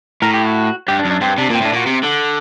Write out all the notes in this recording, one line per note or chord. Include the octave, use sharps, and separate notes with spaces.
A2 A#4
G4
F#4
G2 G4
D4
F#2
D4
G2 C4
C3 D4
A#2 C4
A2 D4
A#2 F#4
C3
D3